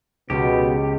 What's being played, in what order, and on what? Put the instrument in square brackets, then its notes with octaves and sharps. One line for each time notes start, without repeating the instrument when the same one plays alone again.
[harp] C#2 [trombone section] B2 [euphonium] B3 [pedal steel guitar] G4